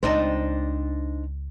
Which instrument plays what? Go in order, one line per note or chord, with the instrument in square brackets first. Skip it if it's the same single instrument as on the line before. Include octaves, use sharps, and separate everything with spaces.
[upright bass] C#2 [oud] C4 D4 D#4